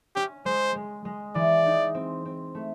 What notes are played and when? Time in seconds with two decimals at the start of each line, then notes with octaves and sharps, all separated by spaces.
0.16 C#4 G4
0.45 G#3 C5
0.75 G#3
1.05 G#3
1.35 E3 D5
1.66 D#4
1.95 C4
2.25 C4
2.55 A3